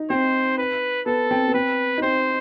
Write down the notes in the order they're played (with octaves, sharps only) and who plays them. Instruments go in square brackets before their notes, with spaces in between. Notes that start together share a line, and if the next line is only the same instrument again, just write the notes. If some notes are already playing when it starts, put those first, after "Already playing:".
Already playing: [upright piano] D#4
[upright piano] C4 [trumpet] C5
[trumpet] B4
[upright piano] B3 [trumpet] A4
[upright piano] C4
B3
[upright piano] C4 [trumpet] B4
[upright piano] D#4
[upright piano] C4 [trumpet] C5